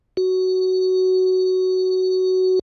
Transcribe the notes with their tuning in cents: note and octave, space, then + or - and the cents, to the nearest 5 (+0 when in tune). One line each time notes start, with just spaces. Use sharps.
F#4 +10